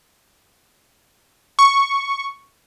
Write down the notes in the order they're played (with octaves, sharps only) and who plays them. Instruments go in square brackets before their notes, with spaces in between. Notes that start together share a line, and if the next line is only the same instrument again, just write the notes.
[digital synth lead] C#6